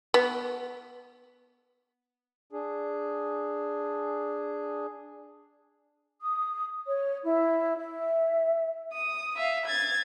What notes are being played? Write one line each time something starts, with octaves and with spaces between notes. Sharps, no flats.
B3
D4 G#4
D#6
C#5
E4
E5
D#6
E5 F5
G#6 A6